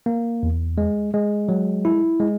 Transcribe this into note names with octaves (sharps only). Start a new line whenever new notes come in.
A#3
E2
G#3
G#3
F#3
E4
G#3